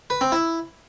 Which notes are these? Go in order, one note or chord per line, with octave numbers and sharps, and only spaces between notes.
B4
C4
E4